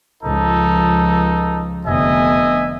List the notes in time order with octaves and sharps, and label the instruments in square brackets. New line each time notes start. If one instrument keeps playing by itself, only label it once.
[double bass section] C#2 F3 [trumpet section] D#4 A4
[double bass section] F1 D3 B3 [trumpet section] D#5 E5 G#5